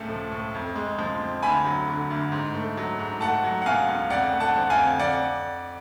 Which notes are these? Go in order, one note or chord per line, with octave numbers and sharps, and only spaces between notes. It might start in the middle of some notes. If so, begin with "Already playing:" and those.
Already playing: C#2 A2 A3
F3
A2
F2
G#3
F3
F2
D2 G#5 B5
F#3
D3
D2
G#2
A3
F#3
G#2
A3 F#5 A5
F#3
F#5
B2 F5 G#5
C#2
F2 D5 F#5
A3
F#5 A5
F3
F5 G#5
F2
F2 D5 F#5